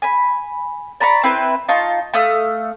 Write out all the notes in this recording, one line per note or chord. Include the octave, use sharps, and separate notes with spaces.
G#5 B5
D5 A#5 B5 C#6
C4 E4 B4
D#4 F4 A5 C#6
A3 F5 D#6